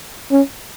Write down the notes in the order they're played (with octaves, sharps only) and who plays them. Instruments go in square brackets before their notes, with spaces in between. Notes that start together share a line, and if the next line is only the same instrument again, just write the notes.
[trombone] C#4